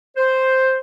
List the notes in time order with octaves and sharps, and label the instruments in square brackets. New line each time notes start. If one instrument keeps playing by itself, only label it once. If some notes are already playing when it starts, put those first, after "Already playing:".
[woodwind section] C5